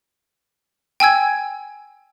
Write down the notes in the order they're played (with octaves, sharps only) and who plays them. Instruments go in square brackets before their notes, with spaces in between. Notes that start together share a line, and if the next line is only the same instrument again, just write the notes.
[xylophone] G5 G#5 E6 G#6